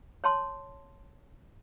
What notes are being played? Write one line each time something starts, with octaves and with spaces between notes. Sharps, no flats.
C#5 A5 C6